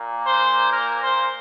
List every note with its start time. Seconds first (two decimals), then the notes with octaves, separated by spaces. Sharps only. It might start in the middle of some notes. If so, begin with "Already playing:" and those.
Already playing: A#2 A#3
0.25 C5
0.71 A#4
1.03 C5